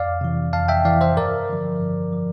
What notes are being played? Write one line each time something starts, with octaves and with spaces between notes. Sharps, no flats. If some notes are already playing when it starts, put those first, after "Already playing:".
Already playing: F2 D5 F5
C3 E3
F2 F5 A5
E5 G5
C3 E3 D5 F5
C5 E5
G2 A#4 D5
D3 F3
G2
F3